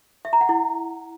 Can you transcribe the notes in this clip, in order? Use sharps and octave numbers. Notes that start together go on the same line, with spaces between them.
E5
A#5
F#5
E4